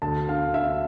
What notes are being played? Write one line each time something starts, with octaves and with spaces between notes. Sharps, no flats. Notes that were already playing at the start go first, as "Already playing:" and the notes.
D2 A5
D3 F5
D3 E5